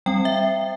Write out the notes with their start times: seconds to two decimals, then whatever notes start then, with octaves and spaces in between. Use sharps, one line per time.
0.06 G3 C4 G5
0.25 E5